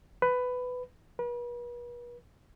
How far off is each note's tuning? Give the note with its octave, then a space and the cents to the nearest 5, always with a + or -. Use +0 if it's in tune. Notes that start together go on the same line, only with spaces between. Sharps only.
B4 +15
B4 -40